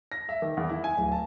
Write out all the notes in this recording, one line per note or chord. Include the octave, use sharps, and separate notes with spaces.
A#6
E5
D#3
E2
E4
G#5
D1
A5